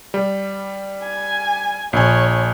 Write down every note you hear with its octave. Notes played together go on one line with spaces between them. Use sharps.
G3
G#5
A#1 C#5 G#5